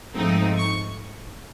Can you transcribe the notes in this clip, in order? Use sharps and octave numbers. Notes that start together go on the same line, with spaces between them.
G#2 F3 A3 C4 D#4
C#6